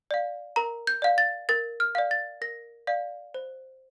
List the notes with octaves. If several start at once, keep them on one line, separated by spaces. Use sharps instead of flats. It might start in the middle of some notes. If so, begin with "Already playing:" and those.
D5 F5
A#4 A#5
G6
D5 F5
A6
A#4 A6
F6
D5 F5
A6
A#4 A#6
D5 F5
C5